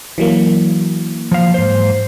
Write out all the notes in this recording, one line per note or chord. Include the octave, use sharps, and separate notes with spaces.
E3 F#3 A#3
F3 F5
G#2 C5